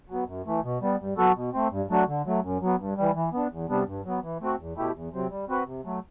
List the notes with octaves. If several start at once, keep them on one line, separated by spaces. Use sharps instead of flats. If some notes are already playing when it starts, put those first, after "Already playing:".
F#3 B3
F#2
E3 A3
B2
G3 B3
G2
F#3 B3 F#4 A4
B2
A3 C4
G2
F#3 A3 D4 F#4
D3
F#3 A3
F#2
F#3 B3
G2
E3 G3
E3
B3 D4
E2
C3 G3 B3 D4
G2
F#3 B3
E3
A3 C4 F#4
E2
B2 A3 E4 G4
E2
C3 F#3 C4
G3
C4 F#4 B4
C3
F#3 A3